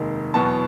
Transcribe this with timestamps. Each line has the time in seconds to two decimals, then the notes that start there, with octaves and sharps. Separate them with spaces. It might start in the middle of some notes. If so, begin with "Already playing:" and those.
Already playing: F1 D#2 D#3 G#3
0.34 E2 B2 F#3 B3 A5